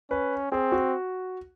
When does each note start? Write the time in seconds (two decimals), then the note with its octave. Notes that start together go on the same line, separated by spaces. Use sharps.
0.10 C#4 B4
0.52 C4 G#4
0.72 F#4